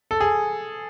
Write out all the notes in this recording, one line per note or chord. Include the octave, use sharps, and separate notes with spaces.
A4
G#4